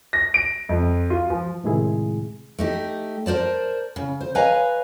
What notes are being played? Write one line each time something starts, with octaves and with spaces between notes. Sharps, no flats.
A#6
D7
F2
F4
F3
A2 C3 D#3 G#3 E4 G#4
A3 D#4 G4
A#4 C5 D5 A5
C#3
C5
B4 C#5 D#5 F5 G#5 A#5